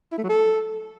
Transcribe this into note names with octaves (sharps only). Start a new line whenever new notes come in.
E4
A3
F#3
A4